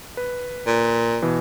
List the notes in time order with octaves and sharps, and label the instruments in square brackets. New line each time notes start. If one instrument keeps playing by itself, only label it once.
[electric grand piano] B4
[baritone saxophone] A#2
[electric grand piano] B2 E3